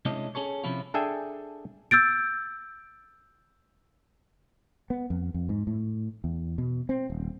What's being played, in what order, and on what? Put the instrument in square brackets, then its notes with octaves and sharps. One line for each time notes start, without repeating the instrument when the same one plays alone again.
[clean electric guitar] C3 G#3 C#4 D4 E4 D#5
C#4 G#4 A4 C#5
C3 F3 C#4 E4 F4
[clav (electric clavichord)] D4 G#4 A4 E5 G5 G#5
[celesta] E6 G6 A6 D7
[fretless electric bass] B3
F2
F2
G#2
A2
E2
B2
C4
D#1